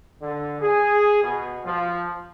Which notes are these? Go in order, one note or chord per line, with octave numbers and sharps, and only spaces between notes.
D3
G#4
B2
F3